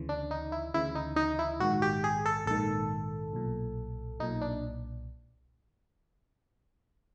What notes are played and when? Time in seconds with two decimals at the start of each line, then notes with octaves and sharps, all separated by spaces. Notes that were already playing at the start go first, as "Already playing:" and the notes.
Already playing: D2 C#3 E3
0.09 D4
0.31 D#4
0.52 E4
0.74 D2 C#3 E3 E4
0.95 D#4
1.16 D#4
1.39 E4
1.60 A#1 G#2 D#3 F#4
1.82 G4
2.04 G#4
2.26 A4
2.46 A#1 G#2 D#3 A4
3.33 B1 A#2
4.20 B1 A#2 D#4
4.41 D4